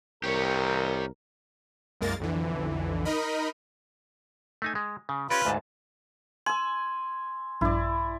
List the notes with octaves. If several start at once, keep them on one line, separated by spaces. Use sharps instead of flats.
C2 G4 A#4 C#5
C2 F#2 G#3 A#3 A#4 A6
B1 F2 D3 E3
D#4 A#4 D#5 B5
A3 D#4 G#5
G#3
C#3
C#4 F4 G4 B4 D5
D2 G#2 A5
G#5 C6 E6
A#1 G2 E4 D5